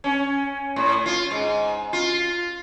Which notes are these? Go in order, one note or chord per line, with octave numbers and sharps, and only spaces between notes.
C#4
A2
F4
G#2
F4